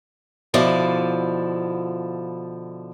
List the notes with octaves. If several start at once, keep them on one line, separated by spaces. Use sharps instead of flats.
B2 D3 F3 E4 D5